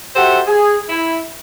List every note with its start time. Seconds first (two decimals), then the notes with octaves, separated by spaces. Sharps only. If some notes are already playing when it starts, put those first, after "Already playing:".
0.16 F#4 G4 A4 C5 E5 F#5
0.47 G#4
0.89 E4